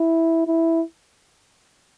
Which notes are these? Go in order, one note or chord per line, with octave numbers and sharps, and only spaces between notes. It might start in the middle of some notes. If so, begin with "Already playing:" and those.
Already playing: E4
E4